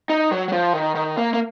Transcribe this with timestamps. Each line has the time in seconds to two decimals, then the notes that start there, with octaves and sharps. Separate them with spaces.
0.10 D#4
0.32 F#3
0.48 F#3
0.52 F3
0.74 D#3
0.95 D#3
1.18 A#3
1.34 A#3